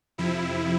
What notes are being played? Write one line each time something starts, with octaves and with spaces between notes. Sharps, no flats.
F2 C3 F3 E4